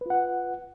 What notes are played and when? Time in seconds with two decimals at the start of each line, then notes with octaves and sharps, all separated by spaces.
0.01 B4
0.06 F4
0.10 F#5